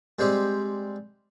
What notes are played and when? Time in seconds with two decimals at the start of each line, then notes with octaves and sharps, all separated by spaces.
0.19 G3 G#3 C4 G4